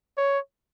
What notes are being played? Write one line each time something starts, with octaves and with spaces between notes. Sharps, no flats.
C#5